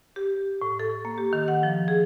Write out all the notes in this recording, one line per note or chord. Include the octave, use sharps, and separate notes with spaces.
G4
A2
A4
A#3
G4
D#3
F#5
F3
G#4